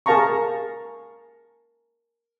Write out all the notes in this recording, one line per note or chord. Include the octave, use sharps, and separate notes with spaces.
G#4 A#4 F5 A5 A#5 C#6